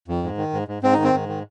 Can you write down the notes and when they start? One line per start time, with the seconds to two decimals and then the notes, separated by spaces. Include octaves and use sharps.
0.08 F2
0.23 G#2
0.37 D#3
0.53 G#2
0.68 G#2
0.83 G#2 C4
0.93 D#3 D#4
1.04 C4
1.13 G#2
1.29 D#3